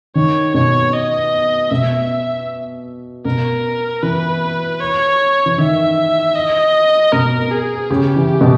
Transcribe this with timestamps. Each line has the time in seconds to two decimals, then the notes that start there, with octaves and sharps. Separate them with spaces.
0.15 D#3 C#5
0.54 B2 C#5
0.93 D#5
1.70 B2 E5
3.25 B2 A#4
4.03 E3 B4
4.80 C#5
5.46 E3
5.58 D#3 E5
6.35 D#5
7.12 B2 A#4
7.51 G#4
7.90 C#3 G4
8.16 E3
8.41 B2